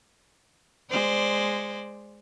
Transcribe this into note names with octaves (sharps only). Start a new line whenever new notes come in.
G#3 C5 D5